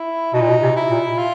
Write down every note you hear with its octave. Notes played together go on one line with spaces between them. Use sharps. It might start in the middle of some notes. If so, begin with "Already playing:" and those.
Already playing: E4
B2 D#4
A#2
B2
C3
E4
A#2
F4